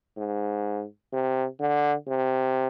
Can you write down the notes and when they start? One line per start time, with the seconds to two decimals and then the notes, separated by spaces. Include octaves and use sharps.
0.18 G#2
1.13 C3
1.60 D3
2.08 C3